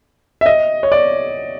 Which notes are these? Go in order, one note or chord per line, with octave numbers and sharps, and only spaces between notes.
E5
D#5
C#5
D5